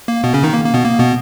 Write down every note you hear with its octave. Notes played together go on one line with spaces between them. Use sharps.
A#3
B2 B3
C#3 C#4
D#3 D#4
A#3
A#3
B2 B3
A#3
B2 B3